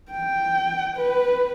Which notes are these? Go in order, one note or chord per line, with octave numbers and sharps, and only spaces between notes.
G5
B4